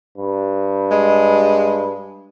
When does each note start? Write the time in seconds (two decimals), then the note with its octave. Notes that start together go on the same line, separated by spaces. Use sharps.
0.18 G2
0.91 G#3